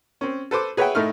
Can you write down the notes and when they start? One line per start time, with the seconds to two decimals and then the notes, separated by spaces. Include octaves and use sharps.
0.21 C4 C#4
0.51 A4 B4 C5 D6
0.77 G#4 B4 C#5 E5 F#5 G5
0.95 A2 A3 D#4 F6